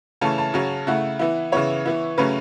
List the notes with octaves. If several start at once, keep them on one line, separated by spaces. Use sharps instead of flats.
C#3 E3 A3 C#4 A5
A5
C#3 F#3 C#4
C#3 A3 E4 F#5
E3 B3 E4
C#3 E3 B3 E4 C#5
E3 B3 E4
C#3 F#3 A3 C#4 B4